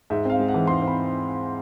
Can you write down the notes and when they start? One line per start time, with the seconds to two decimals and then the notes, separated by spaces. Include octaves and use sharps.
0.10 G#2 E5
0.25 C4 F5
0.40 G#3
0.48 F#5
0.54 E3
0.67 G#2 C6
0.82 C4
0.88 B5